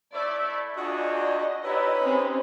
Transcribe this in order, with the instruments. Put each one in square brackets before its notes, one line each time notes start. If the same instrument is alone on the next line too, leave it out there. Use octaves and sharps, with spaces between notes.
[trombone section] A3 E4 [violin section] D5
[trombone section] E2 G#4 [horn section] D4 F4 F#4 [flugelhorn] D5 [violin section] D#5
[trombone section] A#2 B3 E4 [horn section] D#4 G4 B4 [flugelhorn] C#5
[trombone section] G#3 [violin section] C4 C#4